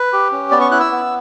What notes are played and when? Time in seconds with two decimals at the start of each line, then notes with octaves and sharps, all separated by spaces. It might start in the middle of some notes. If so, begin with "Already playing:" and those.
Already playing: B4
0.13 G4
0.32 C#4
0.51 B3 D5
0.61 C#6
0.71 E4 F#6
0.80 E6
0.91 B3